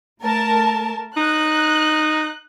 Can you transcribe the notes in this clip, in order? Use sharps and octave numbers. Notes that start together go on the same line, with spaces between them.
A3 A#4 A5
D#4 F#6